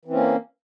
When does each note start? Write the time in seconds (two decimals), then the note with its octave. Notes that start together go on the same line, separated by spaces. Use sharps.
0.05 E3
0.08 C4
0.11 C#4
0.13 A#3